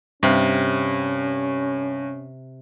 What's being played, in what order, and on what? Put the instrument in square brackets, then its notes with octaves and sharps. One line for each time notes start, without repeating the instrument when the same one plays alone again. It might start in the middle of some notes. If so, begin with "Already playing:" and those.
[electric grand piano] G2 [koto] C3 [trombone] C#4